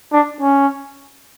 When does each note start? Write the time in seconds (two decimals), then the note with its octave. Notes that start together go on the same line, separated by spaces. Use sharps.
0.13 D4
0.41 C#4